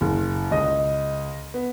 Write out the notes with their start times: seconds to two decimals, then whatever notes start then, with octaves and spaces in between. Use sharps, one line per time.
0.01 F#1
0.51 C#2 D#5
1.54 B3